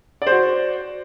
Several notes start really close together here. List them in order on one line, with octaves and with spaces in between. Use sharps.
D5 C5 F#4